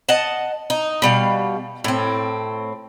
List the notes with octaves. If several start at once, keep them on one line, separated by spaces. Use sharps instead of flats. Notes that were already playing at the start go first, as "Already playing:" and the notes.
D#5 F#5 A5
D#4
B2 G3 F5
A2 C4